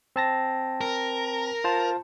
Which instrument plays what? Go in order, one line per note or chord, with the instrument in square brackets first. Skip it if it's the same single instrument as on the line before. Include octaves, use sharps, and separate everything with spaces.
[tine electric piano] C4 A5 A#6
[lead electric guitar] A#4
[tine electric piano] F4 C5 A5